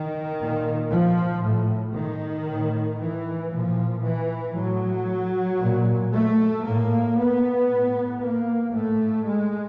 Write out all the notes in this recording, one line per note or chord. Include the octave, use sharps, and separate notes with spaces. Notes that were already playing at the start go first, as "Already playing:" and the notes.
Already playing: D#3
A#2
F3
A2
D#3
A2
E3
A#2 F3
E3
A2 F#3
A#2
A3
A2 A#3
B3
A2
A#3
A2 A3
G#3